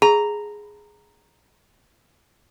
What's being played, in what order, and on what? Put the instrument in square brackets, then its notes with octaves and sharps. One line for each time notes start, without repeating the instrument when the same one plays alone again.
[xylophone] G#4 [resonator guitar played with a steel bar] A#5